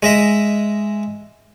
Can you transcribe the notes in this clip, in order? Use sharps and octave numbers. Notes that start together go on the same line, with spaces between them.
G#3 D#5 E5